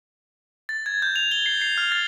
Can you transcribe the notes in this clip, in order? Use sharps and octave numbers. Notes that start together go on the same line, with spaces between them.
A6
G#6
G6
F7
G7
C7
C7
F6
A6